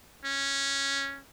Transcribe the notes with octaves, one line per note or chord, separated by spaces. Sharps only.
C#4